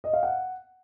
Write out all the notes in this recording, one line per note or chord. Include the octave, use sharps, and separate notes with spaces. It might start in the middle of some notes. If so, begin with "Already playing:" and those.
D#5
F5
F#5